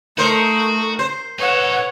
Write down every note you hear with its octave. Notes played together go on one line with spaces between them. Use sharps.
A3 D#4 F#4 A#4 C5
C5
D#4 A4 B4 C#5 F#5